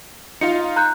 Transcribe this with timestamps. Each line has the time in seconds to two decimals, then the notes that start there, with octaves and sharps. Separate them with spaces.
0.41 D#4 F4 F5 C#7
0.76 A#5 F#6 G6